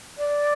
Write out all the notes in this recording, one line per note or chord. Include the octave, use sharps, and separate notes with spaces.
D5